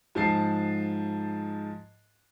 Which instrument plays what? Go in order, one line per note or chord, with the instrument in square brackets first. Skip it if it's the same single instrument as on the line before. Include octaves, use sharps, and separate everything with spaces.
[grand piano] G#2 F3 A5 C7